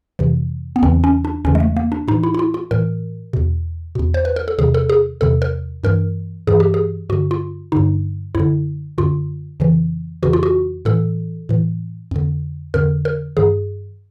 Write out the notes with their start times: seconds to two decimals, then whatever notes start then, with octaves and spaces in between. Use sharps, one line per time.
0.19 F2 C3 E3
0.76 B3
0.83 E2 C#3 E3 C4
1.04 C#4
1.25 D4
1.45 E2 C#3 E3 C#4
1.55 G#3
1.60 A3
1.76 A#3
1.92 D4
2.08 A2 D#4
2.12 E3
2.23 E4
2.34 E4
2.39 F4
2.54 F4
2.71 A2 E3 A#4
3.33 E2 B2
3.95 E2 B2
4.14 C5
4.25 B4
4.36 A#4
4.48 A4
4.59 E2 C3 D#3 G#4
4.74 A4
4.89 G#4
5.21 E2 C3 D#3 A4
5.42 A#4
5.84 G2 E3 A#4
6.47 G2 E3 G#4
6.60 G4
6.74 G#4
7.09 G2 F#4
7.13 D3
7.31 F4
7.72 G2 D3 D#4
8.35 F#2 D3 E4
8.98 F#2 D3 F4
9.60 F2 C#3 E3
10.23 F2 C#3 E3 F#4
10.33 F4
10.43 F#4
10.85 A2 E3 A4
11.49 A2 E3
12.11 F2 D3
12.74 F2 D3 A#4
13.05 A#4
13.37 G2 D#3 G#4